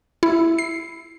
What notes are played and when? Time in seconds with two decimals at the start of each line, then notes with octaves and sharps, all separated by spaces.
0.23 E4
0.58 C7